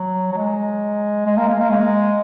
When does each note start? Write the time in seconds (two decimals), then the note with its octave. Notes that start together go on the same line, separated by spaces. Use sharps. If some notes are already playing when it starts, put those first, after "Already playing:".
Already playing: F#3
0.32 F#3
0.37 G#3
1.26 G#3
1.37 A#3
1.48 G#3
1.60 A#3
1.70 G#3